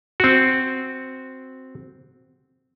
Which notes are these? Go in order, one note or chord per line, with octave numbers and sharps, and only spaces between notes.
C4 F#4